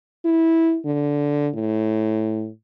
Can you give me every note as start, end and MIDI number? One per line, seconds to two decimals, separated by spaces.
0.25 0.78 64
0.86 1.49 50
1.54 2.49 45